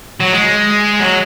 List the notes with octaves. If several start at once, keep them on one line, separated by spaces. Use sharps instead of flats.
F#3
G#3
F#3